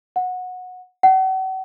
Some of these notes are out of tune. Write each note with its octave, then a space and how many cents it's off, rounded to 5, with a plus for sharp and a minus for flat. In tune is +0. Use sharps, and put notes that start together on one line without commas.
F#5 -20
F#5 +40